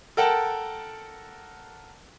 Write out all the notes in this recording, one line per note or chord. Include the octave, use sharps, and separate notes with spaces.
A4 A#4 F#5 G5 A5